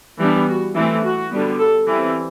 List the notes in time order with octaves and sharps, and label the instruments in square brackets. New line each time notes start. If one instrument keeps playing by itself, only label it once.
[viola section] E3 G3 B3 D4
F#4
E3 A3 C4 E4
F#4
D3 G3 B3
A4
E3 G3 C4